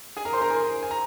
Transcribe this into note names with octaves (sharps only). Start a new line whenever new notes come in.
G#4 G#5
A#4 A#5
C5 C6
A#4 A#5
G#4 G#5
G#5
A#5